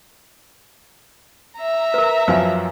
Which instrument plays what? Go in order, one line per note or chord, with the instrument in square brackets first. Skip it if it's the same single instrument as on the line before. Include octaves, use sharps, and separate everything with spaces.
[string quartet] E5 A#5
[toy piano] A#4 B4
[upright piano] F#2 F3 F#3 [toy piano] B4 F5 G#5